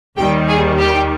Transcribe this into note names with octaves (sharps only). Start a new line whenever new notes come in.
D#2 D#3 G3 G4 G5
G#4 G#5
G4 G5